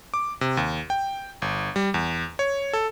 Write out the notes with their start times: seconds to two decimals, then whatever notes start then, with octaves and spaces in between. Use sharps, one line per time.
0.14 D6
0.41 C3
0.57 D#2
0.90 G5
1.42 G1
1.76 G3
1.94 E2
2.39 C#5
2.73 A4